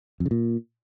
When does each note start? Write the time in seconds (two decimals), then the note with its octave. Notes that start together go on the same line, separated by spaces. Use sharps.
0.20 F2
0.26 C#3
0.31 A#2